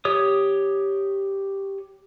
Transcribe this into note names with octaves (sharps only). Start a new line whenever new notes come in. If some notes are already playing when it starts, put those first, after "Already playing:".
G4 C#5 D#6